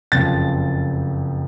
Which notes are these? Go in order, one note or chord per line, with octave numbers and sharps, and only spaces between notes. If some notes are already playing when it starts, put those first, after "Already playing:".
F#1 F2 C#3 F3 A6